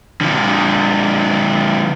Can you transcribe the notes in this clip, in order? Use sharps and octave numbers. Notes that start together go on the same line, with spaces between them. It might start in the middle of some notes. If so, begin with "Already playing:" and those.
D3 F3